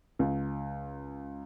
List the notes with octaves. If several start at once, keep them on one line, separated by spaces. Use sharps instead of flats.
C#2